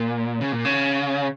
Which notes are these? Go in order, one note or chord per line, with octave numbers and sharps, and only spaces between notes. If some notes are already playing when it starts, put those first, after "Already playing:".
Already playing: A#2
C#3
A#2
C#3